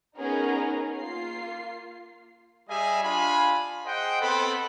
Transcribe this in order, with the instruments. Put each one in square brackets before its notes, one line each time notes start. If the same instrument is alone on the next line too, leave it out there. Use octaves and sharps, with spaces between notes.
[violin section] B3 C#4 D#4 G#4 A#4 A#5
A#3 F4 C7
[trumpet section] G3 G#4 D#5 E5 G#5
D4 F4 F5 G#5 B5
G#4 C5 D#5 F#5 G5
B3 C4 A4 C5 B5